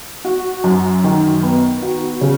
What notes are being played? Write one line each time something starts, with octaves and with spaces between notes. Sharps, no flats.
F#4
F#2
D#3
B3
F#4
C#3